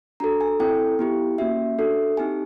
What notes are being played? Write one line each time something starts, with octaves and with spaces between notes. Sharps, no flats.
D4 F#4 A4 A#5
G#5
C4 E4 A4 G5
B3 E4 G4
A#3 C#4 F#4 E5
D4 F#4 A4
C4 D#4 G4 G#5